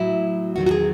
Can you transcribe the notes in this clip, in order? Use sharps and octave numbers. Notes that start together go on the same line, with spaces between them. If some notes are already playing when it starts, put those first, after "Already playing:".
Already playing: A2 F#3 E4
E2 D#3 F#3 F#4
F#4
G#4